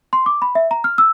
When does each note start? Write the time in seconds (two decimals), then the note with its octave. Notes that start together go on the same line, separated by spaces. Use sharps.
0.13 C6
0.26 D6
0.42 B5
0.55 E5
0.71 A#5
0.84 F6
0.98 E6